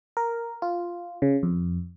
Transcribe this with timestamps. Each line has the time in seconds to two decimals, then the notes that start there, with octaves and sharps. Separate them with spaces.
0.17 A#4
0.62 F4
1.22 C#3
1.43 F2